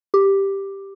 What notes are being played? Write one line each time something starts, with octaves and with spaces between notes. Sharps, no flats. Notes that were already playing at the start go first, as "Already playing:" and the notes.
G4